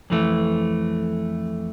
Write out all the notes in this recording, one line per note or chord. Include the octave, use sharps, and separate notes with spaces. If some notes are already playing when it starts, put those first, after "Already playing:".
F2 E3 A3